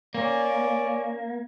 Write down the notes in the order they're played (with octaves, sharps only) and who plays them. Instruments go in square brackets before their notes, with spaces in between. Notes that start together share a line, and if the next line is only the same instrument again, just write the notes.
[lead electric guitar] A#3 [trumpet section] C#4 D5